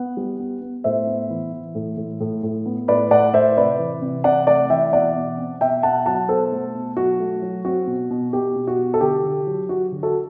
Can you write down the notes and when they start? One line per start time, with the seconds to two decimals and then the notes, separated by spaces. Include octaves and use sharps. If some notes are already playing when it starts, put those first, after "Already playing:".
Already playing: B3 F#5
0.17 G3
0.40 B3
0.62 B3
0.84 A2 C5 E5
1.07 B3
1.30 E3
1.52 E3
1.75 A2
1.97 A2
2.21 A2
2.43 A2
2.66 B3
2.88 A2 B4 D5
3.11 A2 D5 F#5
3.33 A2 C5 E5
3.57 C3 B4 D5
3.79 E3
4.02 C3
4.24 C3 D5 F#5
4.47 A3 D5 F#5
4.70 E3 E5 G5
4.92 B2 D5 F#5
5.16 B2
5.38 C4
5.61 B2 E5 G5
5.83 B2 F#5 A5
6.06 F#3 F#5 A5
6.28 B2 A4 C5
6.52 A3
6.75 B2
6.97 F#3 F#4
7.20 A3
7.42 F#3
7.65 C4 F#4
7.87 B2
8.10 B2
8.33 B2 G4
8.56 B2
8.67 F#4
8.79 B2
8.94 A4
9.01 D3 G4
9.24 D3
9.47 F#3
9.69 F#3 F#4
9.92 D3
10.03 F#4 A4